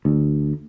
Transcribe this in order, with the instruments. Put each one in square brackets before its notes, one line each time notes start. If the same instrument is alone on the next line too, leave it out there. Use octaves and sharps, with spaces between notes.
[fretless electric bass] D2